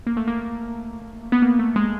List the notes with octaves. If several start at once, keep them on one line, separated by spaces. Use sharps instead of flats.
A#3
A3
A#3
B3
A#3
A3
G#3